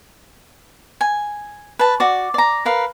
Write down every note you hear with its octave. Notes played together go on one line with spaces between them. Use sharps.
G#5
B4 A5
F#4 D5
D5 A#5
A#4 B4 F5